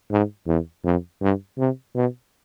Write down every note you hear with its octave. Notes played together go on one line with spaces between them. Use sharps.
G#2
E2
F2
G2
C3
B2